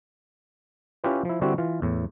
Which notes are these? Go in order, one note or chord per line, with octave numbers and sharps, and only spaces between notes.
C#4 E4 F4 G4 B4
F3 E4
D3 G3 C4 E4 F#4
E3 F4
E2 A2